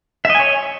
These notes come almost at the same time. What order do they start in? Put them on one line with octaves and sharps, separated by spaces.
E5 D#5 G#5 C#5